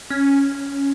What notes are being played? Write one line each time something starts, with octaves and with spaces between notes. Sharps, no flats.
C#4